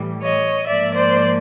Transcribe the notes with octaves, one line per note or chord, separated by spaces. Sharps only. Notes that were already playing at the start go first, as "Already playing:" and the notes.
Already playing: A2 E3 G3
C#5 D#5
G#2 F3 A#3 D5 E5
C5 D5